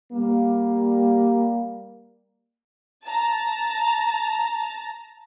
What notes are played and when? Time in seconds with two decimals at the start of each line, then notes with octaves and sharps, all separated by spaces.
0.13 G3 A#3
3.06 A5 A#5